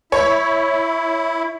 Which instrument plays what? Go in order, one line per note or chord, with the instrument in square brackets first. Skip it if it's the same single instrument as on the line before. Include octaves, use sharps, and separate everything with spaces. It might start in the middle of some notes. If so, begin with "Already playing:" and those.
[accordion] E4 [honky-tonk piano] C#5 C#6